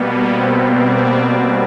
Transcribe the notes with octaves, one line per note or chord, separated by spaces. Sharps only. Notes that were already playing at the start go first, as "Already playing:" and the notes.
Already playing: B2 G3 A#3 B3
C4